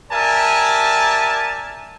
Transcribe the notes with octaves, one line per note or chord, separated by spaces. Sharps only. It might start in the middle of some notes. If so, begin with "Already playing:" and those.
G4 A#4 D5 E5 G#5 A5